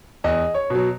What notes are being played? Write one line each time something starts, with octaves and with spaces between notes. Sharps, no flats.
E2 D#5
C#5
B2 F#3